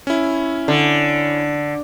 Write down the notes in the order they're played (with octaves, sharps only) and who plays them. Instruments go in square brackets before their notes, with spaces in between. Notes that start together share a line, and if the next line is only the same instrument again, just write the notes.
[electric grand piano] C#4 E4
[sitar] D3